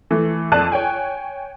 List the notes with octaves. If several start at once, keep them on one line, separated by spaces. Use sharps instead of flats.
E3 A3
F2 D5 A5 F#6 D#7
C#5 G5 G#5